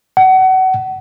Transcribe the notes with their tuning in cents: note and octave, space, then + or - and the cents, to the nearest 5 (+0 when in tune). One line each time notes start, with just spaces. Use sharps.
F#5 +30